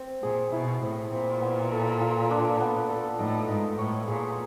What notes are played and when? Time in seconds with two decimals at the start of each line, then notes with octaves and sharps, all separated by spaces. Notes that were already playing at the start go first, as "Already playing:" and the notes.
Already playing: C4
0.23 A#2 G#4
0.52 B2 E4
0.82 A2 C4
1.11 A#2 C4
1.41 B3
1.72 A4
2.01 F4
2.31 D4
2.60 B3
2.90 A4
3.19 A2 D#4
3.49 G#2 D#4
3.79 A2 C#5
4.08 A#2 G#4